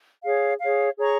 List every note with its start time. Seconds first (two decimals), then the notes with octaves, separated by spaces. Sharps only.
0.23 G#4 C#5 F5
0.60 G#4 C#5 F5
0.97 G#4 C#5 A#5 C#6